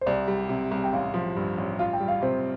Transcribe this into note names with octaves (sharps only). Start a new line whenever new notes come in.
C5
C2 D5
G3
C3
C2
G5
A1 F5
F3
G2
A1
F4 F5
G5
G3
F5
C3 C5